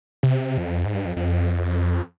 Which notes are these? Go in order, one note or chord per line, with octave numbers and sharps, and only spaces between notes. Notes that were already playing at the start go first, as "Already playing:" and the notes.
C3
F2
G#2
G2
F2
F2